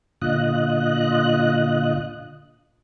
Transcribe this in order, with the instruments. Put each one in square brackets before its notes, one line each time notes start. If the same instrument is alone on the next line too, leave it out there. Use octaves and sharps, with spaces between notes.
[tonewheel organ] A#2 D3 F4 D#5 F#6